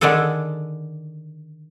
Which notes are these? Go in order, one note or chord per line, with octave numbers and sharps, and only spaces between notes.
D3 D#3 D4 G#4 A4